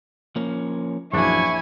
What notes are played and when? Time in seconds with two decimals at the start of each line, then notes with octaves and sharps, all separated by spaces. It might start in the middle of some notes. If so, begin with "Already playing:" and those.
0.36 F3 A#3 C#4
1.13 A#1 F#2 E3 F#3 D4 E4 G#5 C#6